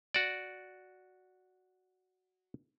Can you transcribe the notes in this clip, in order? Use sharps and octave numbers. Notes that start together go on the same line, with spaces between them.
F#4 D5